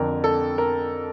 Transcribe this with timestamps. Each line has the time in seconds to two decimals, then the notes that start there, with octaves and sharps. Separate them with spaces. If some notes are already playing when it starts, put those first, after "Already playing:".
Already playing: F2 D3 A#4
0.24 A4
0.58 A#4